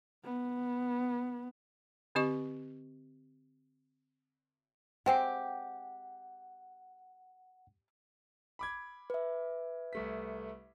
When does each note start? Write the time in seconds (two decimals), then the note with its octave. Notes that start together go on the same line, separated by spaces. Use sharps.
0.25 B3
2.15 D3 C4 G4 D#5 C#6
5.06 G#3 C4 G4 F#5 G5
8.59 B5 D6 G#6
9.10 B4 E5
9.93 C2 A3 B6